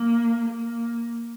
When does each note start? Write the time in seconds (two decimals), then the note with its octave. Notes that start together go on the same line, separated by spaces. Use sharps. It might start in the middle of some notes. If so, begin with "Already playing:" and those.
Already playing: A#3
0.49 A#3